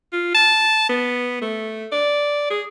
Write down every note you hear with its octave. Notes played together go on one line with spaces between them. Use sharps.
F4
A5
B3
A3
D5
G#4